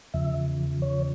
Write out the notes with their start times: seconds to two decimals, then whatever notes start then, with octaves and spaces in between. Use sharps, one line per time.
0.14 E2 C#3 F3 E5
0.82 C#5